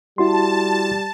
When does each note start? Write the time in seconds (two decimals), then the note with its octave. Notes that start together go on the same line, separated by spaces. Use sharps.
0.18 G3 E4 F#4 A5 C6